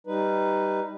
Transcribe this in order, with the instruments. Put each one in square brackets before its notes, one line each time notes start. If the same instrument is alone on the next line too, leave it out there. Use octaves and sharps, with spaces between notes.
[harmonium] G3 D#4 B4